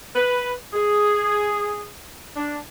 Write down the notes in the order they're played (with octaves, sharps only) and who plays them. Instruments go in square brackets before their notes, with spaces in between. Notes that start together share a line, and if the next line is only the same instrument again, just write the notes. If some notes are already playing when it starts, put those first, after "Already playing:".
[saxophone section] B4
G#4
D4